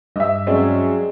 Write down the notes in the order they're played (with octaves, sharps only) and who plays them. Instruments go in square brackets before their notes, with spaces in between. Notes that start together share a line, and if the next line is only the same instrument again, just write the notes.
[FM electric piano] G2 [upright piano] D#5 E5
[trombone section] F#3 C#4 [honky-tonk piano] G#3 C4 D5